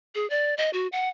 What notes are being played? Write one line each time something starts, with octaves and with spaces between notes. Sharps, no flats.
G#4
D5
D#5
F#4
F#5